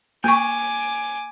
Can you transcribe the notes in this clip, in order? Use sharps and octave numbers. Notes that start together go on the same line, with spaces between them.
A#3 G#5 C#6 D6